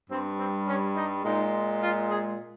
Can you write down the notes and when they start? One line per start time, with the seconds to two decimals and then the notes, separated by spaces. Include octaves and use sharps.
0.10 G2 G3 C4
0.39 C4
0.67 C#4
0.96 D#4
1.24 A#2 G#3 D#4
1.82 F4
2.09 G#4